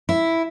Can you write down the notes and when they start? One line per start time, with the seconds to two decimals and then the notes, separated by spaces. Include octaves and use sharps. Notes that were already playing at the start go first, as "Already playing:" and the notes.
0.09 E4